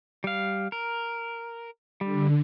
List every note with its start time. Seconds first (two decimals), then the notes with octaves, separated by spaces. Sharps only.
0.24 G3 F5
0.72 A#4
2.01 D3 G3